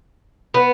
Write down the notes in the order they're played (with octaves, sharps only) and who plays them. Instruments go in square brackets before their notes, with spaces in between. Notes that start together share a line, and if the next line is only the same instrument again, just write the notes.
[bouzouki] B3